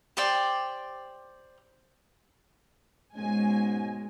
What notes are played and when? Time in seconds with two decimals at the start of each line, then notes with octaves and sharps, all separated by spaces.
0.17 G4 C5 D5 G5
3.16 G#2 B2 G#3 C#4 G#5